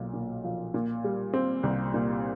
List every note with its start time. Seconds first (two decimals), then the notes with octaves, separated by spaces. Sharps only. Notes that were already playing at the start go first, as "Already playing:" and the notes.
Already playing: B1 A#2
0.14 A#2
0.44 F3
0.74 A#2
1.04 G3
1.33 C4
1.63 C2
1.94 A#2